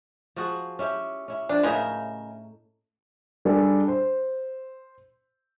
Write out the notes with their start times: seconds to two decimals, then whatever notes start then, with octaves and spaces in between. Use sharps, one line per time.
0.36 F3 F#4 G#4
0.79 C#4 E4 G4
1.28 C#4 E4
1.49 F3 D4
1.63 A2 C#3 D#4 A#4 E5
3.45 G3 D4 G#4 A4
3.88 C5